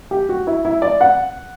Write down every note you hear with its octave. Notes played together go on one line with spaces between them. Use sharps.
G4
F#4
E4
E4
D5
F#5